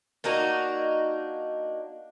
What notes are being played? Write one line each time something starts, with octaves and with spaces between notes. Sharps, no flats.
A#3 D4 D#4 F#4